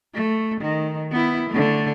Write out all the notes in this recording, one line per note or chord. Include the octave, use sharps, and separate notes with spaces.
A3
D#3
B3 E4
D3 A3